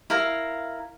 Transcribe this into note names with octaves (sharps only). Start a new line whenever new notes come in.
E4 A#4 F5